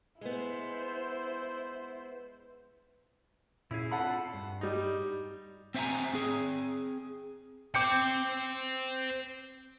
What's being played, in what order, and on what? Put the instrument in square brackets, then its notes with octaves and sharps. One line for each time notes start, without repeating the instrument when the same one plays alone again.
[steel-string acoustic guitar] G#3 B3 [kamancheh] E4 C5
[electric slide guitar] A#2 C#4 G#4 [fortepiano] E4
[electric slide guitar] C4 D4 F4 [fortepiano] A4 F#5 B5
[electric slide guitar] G2
[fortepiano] G3 D#4
[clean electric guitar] C4 C5 E5 G5 G#5 A#5
C4 G#4
[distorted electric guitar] C5 G5 [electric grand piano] D6 G6 C#7